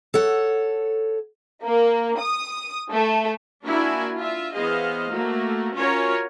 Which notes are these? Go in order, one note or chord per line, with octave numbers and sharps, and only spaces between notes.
A4 C#5 F#5
A#3
D#6
A3
A#3 D4 E4 F#4 E5 G#5
F4 E5
E3 B3 G#4 C5 D#5 F5
A3 A#3 F#4
C#4 F4 F#4 A#4 C#5 A#5